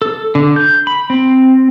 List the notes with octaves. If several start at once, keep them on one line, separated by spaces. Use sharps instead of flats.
A4
D3
G6
B5
C4